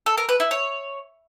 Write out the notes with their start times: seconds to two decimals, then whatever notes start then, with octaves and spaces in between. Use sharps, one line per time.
0.06 A4
0.17 A#4
0.29 B4
0.40 E4
0.51 C#5